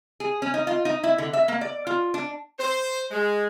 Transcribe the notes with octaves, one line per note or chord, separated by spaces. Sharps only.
G#4
C#4
D#4
F4
D#4
E4
D3
E5
A#3
D5
F4
D4
C5
G#3